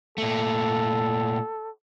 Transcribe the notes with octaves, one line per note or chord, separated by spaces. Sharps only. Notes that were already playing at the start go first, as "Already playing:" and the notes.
A#2 A3 A4